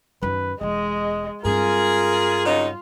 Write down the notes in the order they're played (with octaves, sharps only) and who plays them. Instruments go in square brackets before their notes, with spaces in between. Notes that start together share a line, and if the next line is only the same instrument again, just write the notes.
[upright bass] F#2 D#3 [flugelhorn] B4
[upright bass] E1 E2 [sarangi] G#3 [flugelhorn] D#5
[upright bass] G2 C4 [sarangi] F4 [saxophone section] G#4 [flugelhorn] A#4
[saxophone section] C#3 F#3 D#4